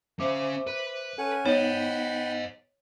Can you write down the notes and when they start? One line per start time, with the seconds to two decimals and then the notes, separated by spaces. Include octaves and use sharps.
0.20 C#4 C5 E5 F5 D6
0.67 B4
1.18 C#4 A4 F#5 G#5
1.46 B3 D#4 C5 C#5 D#5 F#5 G5 B5